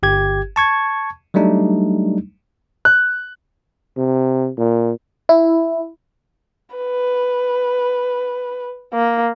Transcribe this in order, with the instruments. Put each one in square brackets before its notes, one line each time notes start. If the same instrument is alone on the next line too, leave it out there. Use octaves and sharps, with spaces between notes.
[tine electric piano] G1 G4 G#6
A5 C#6 G#6
F#3 G3 A3 D4 D#4
[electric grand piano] F#6
[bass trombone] C3
A#2
[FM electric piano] E4
[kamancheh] B4
A#3